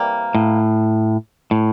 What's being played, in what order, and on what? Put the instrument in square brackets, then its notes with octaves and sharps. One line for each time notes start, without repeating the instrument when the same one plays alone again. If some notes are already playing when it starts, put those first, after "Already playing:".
Already playing: [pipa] C3 E3 G3 A#3
[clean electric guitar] A2
A2